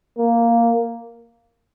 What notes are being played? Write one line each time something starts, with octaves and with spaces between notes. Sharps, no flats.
A#3